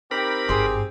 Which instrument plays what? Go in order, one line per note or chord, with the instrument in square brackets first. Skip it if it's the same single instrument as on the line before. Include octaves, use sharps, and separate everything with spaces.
[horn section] C4 D#4 G4 [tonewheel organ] A#4 B5
[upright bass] G#1 G2 [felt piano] G#4 C6